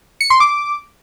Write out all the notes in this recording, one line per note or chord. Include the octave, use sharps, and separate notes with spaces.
C#7
C6
D6